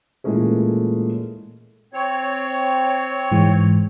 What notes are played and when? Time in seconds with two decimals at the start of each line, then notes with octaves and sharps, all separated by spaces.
0.24 A#2 E3 G#3 A3 C#4 G#4
1.93 C4 C#5
3.31 G#2 E3 G#3